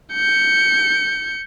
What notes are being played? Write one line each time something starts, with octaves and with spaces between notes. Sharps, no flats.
G6 C#7